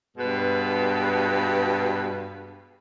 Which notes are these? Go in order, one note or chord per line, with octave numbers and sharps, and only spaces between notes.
G2 B2 G#3 B4